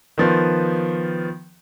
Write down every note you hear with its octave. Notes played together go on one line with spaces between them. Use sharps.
D#3 F3 B3